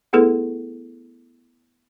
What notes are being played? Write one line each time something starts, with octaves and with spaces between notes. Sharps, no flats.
A3 B3 E4 G#4 A4 B4